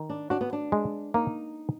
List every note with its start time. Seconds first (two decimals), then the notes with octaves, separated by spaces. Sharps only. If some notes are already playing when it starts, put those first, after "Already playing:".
Already playing: D#3
0.10 D4
0.30 D4 F#4
0.41 B3
0.53 D4
0.72 G#3
1.14 A#3 D#4